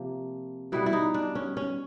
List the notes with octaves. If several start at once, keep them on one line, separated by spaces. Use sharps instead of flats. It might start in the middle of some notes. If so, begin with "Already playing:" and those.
Already playing: C3 F3 A#3
B2 G3 B3 E4
E4
D#4
D4
C#4
C#4